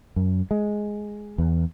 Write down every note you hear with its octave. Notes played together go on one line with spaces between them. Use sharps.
F#2
G#3
E2